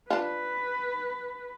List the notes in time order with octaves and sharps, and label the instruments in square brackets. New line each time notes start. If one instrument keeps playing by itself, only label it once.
[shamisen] D4 F4 [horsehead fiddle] B4